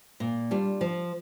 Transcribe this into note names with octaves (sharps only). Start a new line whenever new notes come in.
A#2
G3 D4 F4
F3